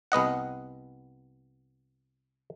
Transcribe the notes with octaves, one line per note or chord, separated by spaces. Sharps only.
C2 B3 D#5 F#5